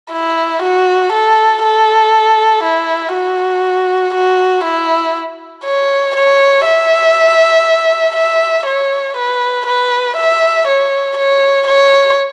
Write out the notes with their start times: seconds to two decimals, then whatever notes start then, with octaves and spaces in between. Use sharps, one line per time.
0.12 E4
0.63 F#4
1.13 A4
1.63 A4
2.64 E4
3.14 F#4
4.14 F#4
4.65 E4
5.65 C#5
6.16 C#5
6.65 E5
8.16 E5
8.66 C#5
9.16 B4
9.67 B4
10.16 E5
10.67 C#5
11.17 C#5
11.67 C#5